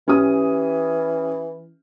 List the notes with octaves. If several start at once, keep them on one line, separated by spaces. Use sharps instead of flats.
E3 C#4 G4 D#6